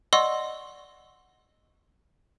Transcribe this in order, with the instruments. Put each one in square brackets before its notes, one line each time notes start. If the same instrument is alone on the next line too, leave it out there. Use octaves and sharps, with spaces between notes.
[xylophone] D5 D#5 F#5 C6 C#6 E6